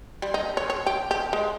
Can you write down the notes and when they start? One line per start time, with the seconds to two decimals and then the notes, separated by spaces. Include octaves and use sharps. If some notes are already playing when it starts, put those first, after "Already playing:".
0.22 G3
0.34 D#4
0.57 C#5
0.70 C#5
0.86 G4
1.11 G4
1.33 G#3